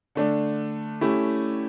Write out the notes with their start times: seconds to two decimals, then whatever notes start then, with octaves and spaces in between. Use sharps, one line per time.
0.15 D3 A3 D4
1.01 A3 C#4 E4 G4